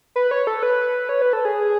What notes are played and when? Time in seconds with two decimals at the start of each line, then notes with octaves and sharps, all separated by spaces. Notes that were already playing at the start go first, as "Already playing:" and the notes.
0.16 B4
0.31 C#5
0.47 A4
0.63 B4
1.09 C#5
1.22 B4
1.33 A4
1.45 G#4